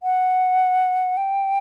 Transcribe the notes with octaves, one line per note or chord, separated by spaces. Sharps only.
F#5
G5